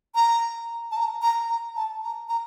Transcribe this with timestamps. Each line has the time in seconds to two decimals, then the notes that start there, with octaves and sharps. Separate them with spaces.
0.15 A#5
0.91 A5
0.96 A#5
1.22 A#5
1.49 A#5
1.76 A5
2.03 A#5
2.29 A#5